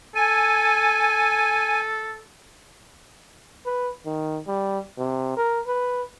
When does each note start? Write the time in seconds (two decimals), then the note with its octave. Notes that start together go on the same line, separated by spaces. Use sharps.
0.15 A4 G#5
3.66 B4
4.06 D#3
4.47 G3
4.98 C3
5.37 A#4
5.67 B4